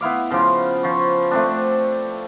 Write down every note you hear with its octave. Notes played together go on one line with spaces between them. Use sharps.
B3 E4 F5 D6
C#3 F3 F4 D6
F3 C#6
A3 C4 D4